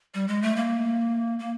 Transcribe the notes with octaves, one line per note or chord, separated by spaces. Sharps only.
G3
G#3
A3
A#3
A#3